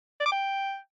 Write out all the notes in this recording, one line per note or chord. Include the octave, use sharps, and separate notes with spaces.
D5
D6
G5